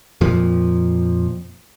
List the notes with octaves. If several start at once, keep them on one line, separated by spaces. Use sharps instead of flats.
F2 A#2 F3